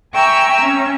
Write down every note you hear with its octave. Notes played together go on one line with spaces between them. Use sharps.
E5 G5 G#5 A#5 C#6 E6
C#4